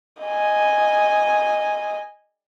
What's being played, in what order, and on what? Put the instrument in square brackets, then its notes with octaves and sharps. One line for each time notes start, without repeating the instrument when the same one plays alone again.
[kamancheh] D#5 G#5